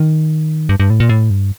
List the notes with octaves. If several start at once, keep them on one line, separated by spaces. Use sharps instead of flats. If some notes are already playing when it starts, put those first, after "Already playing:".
Already playing: D#3
G2
G2
A2
A#2
A2
G2